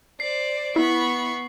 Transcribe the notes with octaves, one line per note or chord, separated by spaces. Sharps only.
C5 D5 C7
B3 E4 B5 C#6